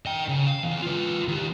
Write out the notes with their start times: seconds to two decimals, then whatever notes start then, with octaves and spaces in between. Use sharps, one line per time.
0.06 D#5 G5
0.28 C#3
0.47 F5
0.64 E2
0.82 F4 B4
1.28 D#3 G4